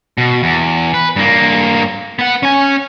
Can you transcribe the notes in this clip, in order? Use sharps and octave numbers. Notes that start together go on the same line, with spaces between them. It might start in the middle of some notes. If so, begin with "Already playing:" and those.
B2
E2
B4
G2 A#3
B3 F#5
C#4 G#5